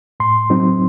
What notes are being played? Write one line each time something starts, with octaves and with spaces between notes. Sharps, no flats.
A2 C6
F#3 C4 D#4